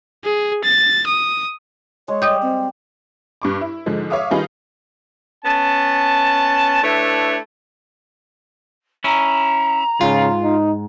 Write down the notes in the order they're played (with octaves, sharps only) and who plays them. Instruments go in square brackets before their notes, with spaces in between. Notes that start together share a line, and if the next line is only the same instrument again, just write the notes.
[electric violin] G#4
A6
D#6
[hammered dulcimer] G#3 [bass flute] C#5
[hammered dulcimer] G3 [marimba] D#5 D#6 G6
[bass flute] C4
[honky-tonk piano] G2 C#6 D6
E4
G#2 D3 F3 G#3
C#5 E5 F5 D6 D#6
D#3 G3 D#4 F4 G#4 B4
[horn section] B3 C#4 A5
A3 D4 E4 B4 C#5
[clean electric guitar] C#4 E4 [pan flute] A#5
[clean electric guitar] G#2 [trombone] C#3 [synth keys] F4
[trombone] D#4